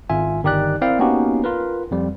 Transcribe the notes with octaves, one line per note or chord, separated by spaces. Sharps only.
G#1 F4 E5 G#5
G1 D#3 D#4 G4 D5 F#6
C4 E4 A#4 D5 F5 G5
A#3 B3 C#4 D#4 F#4 G4
F4 A#4 B4
F2 G3